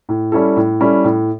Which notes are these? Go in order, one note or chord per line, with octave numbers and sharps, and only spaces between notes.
A2
G3 C#4 E4 A4
A2
G3 C#4 E4 A4
A2